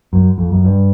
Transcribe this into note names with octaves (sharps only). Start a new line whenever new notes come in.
F#2
F2
F#2
G2